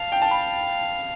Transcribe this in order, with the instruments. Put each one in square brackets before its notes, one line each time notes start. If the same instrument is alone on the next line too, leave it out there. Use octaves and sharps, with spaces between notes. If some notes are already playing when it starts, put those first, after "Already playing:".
Already playing: [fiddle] F5 [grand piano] A5
[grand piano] G5
A5
B5